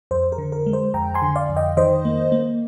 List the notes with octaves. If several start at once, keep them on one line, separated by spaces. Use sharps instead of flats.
F2 C5
A#4
D3
A#4
G#3
C5
F2 G5 A#5
G#5 C6
D3
D5 F5
F2
D#5 G5
D#3 C5 D#5
A#3
A#3